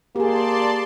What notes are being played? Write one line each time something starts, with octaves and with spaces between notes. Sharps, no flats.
A#3 G4 G#4 D5 A5 C6